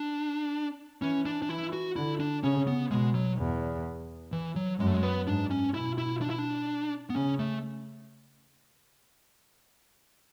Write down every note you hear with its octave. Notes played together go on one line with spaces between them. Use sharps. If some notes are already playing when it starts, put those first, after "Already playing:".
Already playing: D4
E3 C#4
D4
D4
E3 E4
F#4
D3 E4
D4
C#3 C#4
B3
B2 G#3
F#3
E2
E3
F#3
F#2 G#3
A3
G#3
B3
G#2 D4
C#4
B2 E4
E4
D4
E4
D4
B3
C#3 C#4
A3